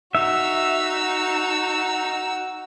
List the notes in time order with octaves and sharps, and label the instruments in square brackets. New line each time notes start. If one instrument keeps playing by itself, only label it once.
[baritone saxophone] D#4 [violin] F#4 E6 [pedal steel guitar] E5